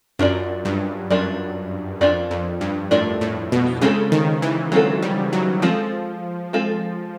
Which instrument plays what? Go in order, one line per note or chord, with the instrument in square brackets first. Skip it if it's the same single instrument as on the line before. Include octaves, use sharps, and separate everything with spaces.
[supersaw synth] F#2 [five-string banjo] D4 F4 A#4 D5
[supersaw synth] G2
[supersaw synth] F#2 [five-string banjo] D4 F4 A#4 D5
[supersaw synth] F2 [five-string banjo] D4 F4 A#4 D5
[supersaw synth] F2
G2
[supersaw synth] A2 [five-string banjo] D4 F4 A#4 D5
[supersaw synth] A2
B2
[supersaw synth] C#3 [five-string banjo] G#3 C4 F4 A4
[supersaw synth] D#3
E3
[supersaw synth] F#3 [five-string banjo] G#3 C4 F4 A4
[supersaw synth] G3
F#3
[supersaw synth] F3 [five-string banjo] G#3 C4 F4 A4
[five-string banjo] G#3 C4 F4 A4